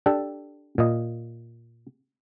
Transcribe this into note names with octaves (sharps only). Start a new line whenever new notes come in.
D4 G4 A4
A#2 D#5